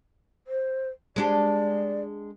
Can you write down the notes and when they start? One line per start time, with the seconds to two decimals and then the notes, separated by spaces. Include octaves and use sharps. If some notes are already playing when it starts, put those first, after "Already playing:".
0.47 C5
1.16 G#3 D4 G4 D5